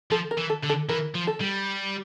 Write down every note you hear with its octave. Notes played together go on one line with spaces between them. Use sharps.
F3 A4
A#4
E3
A4
D3
A4
E3 A#4
F3
A4
G3